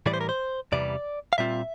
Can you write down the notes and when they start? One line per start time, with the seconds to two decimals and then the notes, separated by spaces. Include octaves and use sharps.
0.06 A2 E3 G3 D5
0.14 C5
0.21 A#4
0.29 C5
0.72 E2 C3 E3 G3 D5
1.33 F5
1.38 A#2 G3 C4 F4 E5